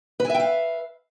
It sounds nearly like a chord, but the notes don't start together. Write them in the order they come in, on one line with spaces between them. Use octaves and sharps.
B4 G#5 E5 G5 F5